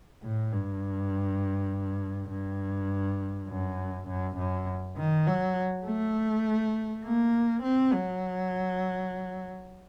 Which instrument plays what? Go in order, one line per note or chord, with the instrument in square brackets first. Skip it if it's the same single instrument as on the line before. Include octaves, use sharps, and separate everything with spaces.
[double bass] A2
G2
G2
F#2
F#2
F#2
D#3
F#3
A3
A#3
C4
F#3